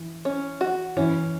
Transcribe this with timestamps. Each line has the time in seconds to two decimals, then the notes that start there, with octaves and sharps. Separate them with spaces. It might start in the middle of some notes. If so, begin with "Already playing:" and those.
Already playing: E3
0.25 C#4
0.61 F#4
0.97 E3 C#4